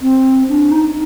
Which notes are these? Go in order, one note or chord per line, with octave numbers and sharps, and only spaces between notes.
C4
D4
D#4